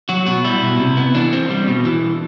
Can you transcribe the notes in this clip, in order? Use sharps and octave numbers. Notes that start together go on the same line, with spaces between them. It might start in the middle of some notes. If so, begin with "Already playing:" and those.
F#3 F#4
B2 F#4
G3 E4
B2
C3
B3
E3 D4
C4
G3
B2
E3